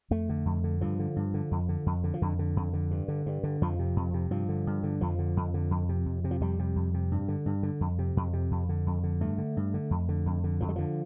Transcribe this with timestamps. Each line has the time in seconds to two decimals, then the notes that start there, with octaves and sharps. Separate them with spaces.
0.11 F2 A3
0.29 D3
0.46 F2
0.64 D3
0.81 G2 F3
0.99 D3
1.16 G2
1.34 D3
1.51 F2
1.69 D3
1.86 F2
2.04 D3
2.14 F3
2.22 F2 D3
2.39 D3
2.56 F2
2.73 D3
2.91 G2
3.08 D3
3.26 G2
3.44 D3
3.62 F2 F3
3.79 C3
3.96 F2
4.14 C3
4.31 G2 F3
4.49 D3
4.67 G2
4.83 D3
5.01 F2 F3
5.19 D3
5.37 F2
5.54 D3
5.71 F2
5.89 C3
6.06 F2
6.24 C3
6.31 F3
6.41 F2 G3
6.59 C3
6.76 F2
6.94 C3
7.12 G2
7.28 D3
7.46 G2
7.63 D3
7.81 F2
7.99 C3
8.17 F2
8.33 C3
8.51 F2
8.69 D3
8.87 F2
9.03 D3
9.21 G2 A3
9.38 D3
9.57 G2
9.74 D3
9.91 F2
10.09 D3
10.26 F2
10.44 D3
10.61 F2 F3
10.69 G3
10.76 D3 F3